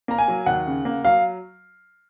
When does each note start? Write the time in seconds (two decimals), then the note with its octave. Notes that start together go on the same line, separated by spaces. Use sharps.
0.08 A#3 A#5
0.18 G#5
0.28 F#3
0.46 D#2 F#5
0.66 C#3
0.85 A#3
1.05 F#3 F5